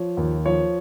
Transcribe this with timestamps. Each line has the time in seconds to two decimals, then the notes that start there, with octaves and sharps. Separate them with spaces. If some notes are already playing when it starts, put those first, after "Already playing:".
Already playing: F3 C#5
0.17 D#2
0.46 F3 C#5